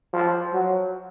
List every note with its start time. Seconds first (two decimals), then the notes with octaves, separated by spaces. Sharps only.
0.13 F3
0.54 F#3